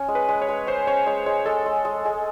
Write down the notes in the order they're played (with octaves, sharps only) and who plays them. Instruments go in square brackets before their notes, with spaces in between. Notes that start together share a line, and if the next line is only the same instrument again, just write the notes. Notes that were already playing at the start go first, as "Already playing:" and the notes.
Already playing: [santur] C#4
G#3
[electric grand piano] B4
[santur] G#3
[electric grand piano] C#5
[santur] G#3
[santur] C#4 [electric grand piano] C5
[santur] C#4 [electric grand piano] C#5
[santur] G#3 [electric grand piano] C#5
[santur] G#3 [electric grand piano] C#5
[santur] G#3 [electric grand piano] A4
[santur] G#3
G#3
G#3